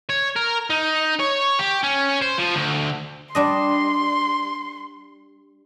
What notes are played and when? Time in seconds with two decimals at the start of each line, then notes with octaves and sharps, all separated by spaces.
0.09 C#5
0.36 A#4
0.70 D#4
1.20 C#5
1.59 G4
1.83 C#4
2.22 C5
2.40 F3
2.55 D2
3.35 G3 D4 D#5 C6